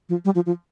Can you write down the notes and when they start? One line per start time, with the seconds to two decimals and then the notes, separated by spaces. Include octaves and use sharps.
0.09 F3
0.25 G3
0.35 F3
0.46 F3